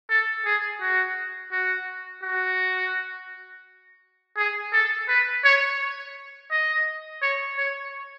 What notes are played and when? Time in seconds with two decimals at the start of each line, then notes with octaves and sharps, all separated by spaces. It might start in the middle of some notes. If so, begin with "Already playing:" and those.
0.10 A4
0.45 G#4
0.81 F#4
1.51 F#4
2.23 F#4
4.37 G#4
4.73 A4
5.08 B4
5.44 C#5
6.51 D#5
7.22 C#5
7.58 C#5